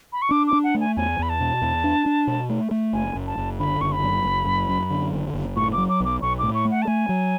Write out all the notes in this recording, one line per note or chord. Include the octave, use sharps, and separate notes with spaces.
B5
C#6
D4 D6
D6
D4
F#5
A3
G#5
E2 G#5
E2 B5
A5
B2
E2
D4
D4
B2
A3
A3
F#1 G#5
F#1
A5
F#1
D3 B5
F#1 C#6
B5
F#2
F#1
F#2
F#2
D3
F#1
F#1
A2 C#6
D6
F#3
D6
B1 D6
B1 C#6
A2 D6
C#6
A3
F#5
A5
A3 G#5
F#3